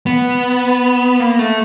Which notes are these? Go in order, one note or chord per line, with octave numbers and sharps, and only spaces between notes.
B3
A#3
A3